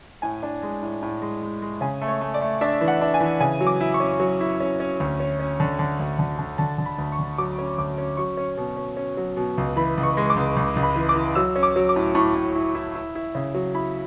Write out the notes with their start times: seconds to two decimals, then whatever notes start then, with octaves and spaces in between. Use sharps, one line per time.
0.22 A2 G#5
0.43 D4
0.63 G#3
0.83 A2
1.03 A2
1.22 G#3
1.41 G#3
1.62 G#3
1.81 C#3 G#5
2.01 A3
2.08 C#5
2.21 A3
2.34 D5
2.41 A3
2.61 D4 E5
2.81 E3
2.88 F#5
3.01 D4
3.14 G#5
3.20 E3
3.40 C#3 G#5
3.61 F#3
3.67 D6
3.81 E4
3.94 C#6
4.00 C#4
4.20 F#3
4.40 E4
4.60 C#4
4.80 C#4
5.00 D2
5.20 C#4
5.39 C#4
5.60 D3
5.79 D3
6.00 D2
6.19 D3
6.39 D3
6.58 D3 A5
6.78 D3
6.85 B5
6.98 D2
7.12 C#6
7.19 D3
7.38 F#3 D6
7.59 C#4
7.78 D2 D6
7.98 C#4
8.17 F#3 C#6
8.37 C#4
8.57 B2
8.77 C#4
8.97 C#4
9.17 F#3
9.37 B2
9.58 C#2
9.76 E3 B5
9.97 C#2
10.03 C#6
10.17 G#3
10.30 D6
10.36 C#2
10.56 C#2
10.76 C#2
10.83 B5
10.96 E3
11.09 D6
11.16 E3
11.35 F#3 E6
11.56 C#4
11.63 D6
11.76 F#3
11.89 D6
11.96 A2
12.15 A2 C#6
12.35 A2
12.55 E4
12.75 E4
12.95 E4
13.15 E4
13.35 C#3
13.54 F#3
13.74 E4 B5